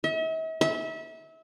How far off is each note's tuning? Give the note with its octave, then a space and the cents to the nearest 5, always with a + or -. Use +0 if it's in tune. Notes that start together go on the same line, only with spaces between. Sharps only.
E5 -45
E5 -30